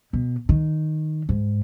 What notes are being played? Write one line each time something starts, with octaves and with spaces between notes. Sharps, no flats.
B2
D#3
G#2